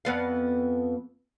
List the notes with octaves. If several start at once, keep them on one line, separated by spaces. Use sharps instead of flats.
F2 B3 F5